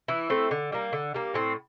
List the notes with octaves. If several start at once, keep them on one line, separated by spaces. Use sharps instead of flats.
E3 E4
A3 C4
D3
G3 A#3
D3
G3 A#3
A2 C4